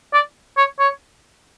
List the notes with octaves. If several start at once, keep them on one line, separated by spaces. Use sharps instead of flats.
D5
C#5
C#5